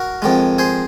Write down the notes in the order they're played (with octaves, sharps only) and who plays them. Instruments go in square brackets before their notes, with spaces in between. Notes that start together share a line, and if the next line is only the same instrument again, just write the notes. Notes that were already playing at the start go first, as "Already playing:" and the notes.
Already playing: [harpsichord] F#4 A#4
F2 D#3 G#3
G#4 C5